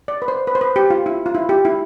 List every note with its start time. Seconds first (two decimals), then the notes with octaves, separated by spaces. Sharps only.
0.08 D5
0.22 B4
0.28 C5
0.47 B4
0.55 C5
0.61 B4
0.76 G4
0.90 F4
1.06 E4
1.26 F4
1.35 E4
1.49 G4
1.65 E4